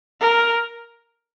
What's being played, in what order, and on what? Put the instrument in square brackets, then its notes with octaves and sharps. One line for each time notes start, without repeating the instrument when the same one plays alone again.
[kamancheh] A#4